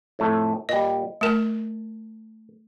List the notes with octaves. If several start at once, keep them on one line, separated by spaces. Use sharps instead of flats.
F2 A2 A3
A#2 G3 D#5
A3 A#4 A5